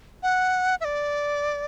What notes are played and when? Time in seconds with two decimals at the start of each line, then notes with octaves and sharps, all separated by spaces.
0.23 F#5
0.81 E5
0.85 D5